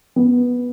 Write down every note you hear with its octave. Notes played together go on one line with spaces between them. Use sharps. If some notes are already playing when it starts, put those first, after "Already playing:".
B3